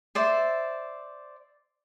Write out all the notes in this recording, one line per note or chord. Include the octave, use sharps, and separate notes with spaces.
C5 D5 E5